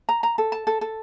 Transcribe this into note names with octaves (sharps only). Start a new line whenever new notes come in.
A#5
A#5
A4
A5
A4
A4